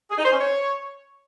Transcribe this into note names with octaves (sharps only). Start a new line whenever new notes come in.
G#4
D#4
C5
C#4
C#5